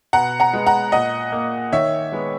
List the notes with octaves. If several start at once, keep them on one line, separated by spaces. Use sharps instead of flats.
B2 F#5 A#5
F#5 A#5
G#3 B3
F#5 A#5
A#2 D#5 F#5
A#3
D#3 C#5 E5
G#3 B3